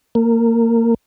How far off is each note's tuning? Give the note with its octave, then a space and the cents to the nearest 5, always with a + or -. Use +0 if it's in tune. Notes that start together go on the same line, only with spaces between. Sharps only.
A#3 -20